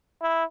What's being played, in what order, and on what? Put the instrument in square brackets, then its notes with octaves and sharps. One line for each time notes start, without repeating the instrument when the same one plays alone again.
[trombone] E4